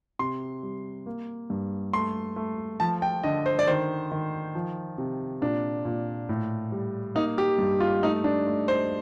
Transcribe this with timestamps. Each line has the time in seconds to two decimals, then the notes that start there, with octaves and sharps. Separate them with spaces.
0.19 C3 C6
0.63 G3
1.06 A#3
1.50 G2
1.93 A3 C6
2.36 A3
2.80 F3 A5
3.02 G5
3.23 D3 D#5
3.46 C5
3.59 D5
3.67 D#3 C5
4.12 D#3
4.55 F3
4.98 C3
5.41 A#2 D4
5.85 A#2
6.29 A2
6.72 G3
7.15 A#3 D#4
7.38 G4
7.59 G2
7.80 F4
8.03 A3 D#4
8.24 D4
8.47 A3
8.68 C5